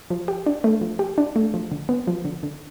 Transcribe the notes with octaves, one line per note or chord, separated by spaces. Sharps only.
F3
G4
D4
A3
F3
G4
D4
A3
F3
D3
B3
F3
D3
D3